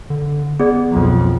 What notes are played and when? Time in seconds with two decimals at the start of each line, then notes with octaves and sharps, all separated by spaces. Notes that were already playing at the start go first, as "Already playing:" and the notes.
0.10 D3
0.60 B3 G#4 D5
0.92 B1 F2